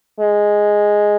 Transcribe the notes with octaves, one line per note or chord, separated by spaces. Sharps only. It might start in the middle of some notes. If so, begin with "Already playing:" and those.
G#3